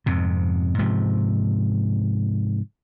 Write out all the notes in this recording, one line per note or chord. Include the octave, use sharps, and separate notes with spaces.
F2 G#2 C3
G#2 C3 F3